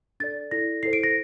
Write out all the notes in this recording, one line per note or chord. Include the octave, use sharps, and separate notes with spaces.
D4 A4 D5 A6
E4 A4 D5 A#6
E4 A4 C5 C7
D7
A#6